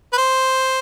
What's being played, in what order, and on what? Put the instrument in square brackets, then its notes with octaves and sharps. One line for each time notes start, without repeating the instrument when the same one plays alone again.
[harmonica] B4
C5